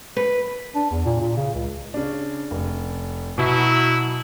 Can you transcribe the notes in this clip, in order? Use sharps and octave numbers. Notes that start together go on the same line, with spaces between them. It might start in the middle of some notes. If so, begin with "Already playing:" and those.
B4
D4
E2
A#2
A#2
C#3
C#2
C#3 D4
F1
B2 F#3 E4